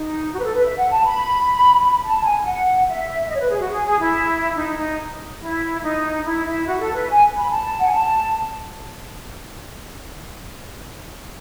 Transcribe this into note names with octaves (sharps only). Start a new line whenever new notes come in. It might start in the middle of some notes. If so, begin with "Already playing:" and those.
Already playing: D#4
F#4
B4
A4
B4
E5
F#5
A5
B5
A5
G#5
F#5
E5
D#5
C#5
B4
G#4
F#4
G#4
G#4
E4
D#4
D#4
E4
D#4
E4
E4
F#4
A4
B4
G#5
B5
A5
F#5
G#5
A5